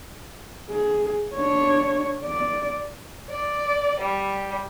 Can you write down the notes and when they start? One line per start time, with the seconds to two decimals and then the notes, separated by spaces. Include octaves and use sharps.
0.70 G#4
1.35 D4 C#5
2.24 D5
3.30 D5
4.01 G3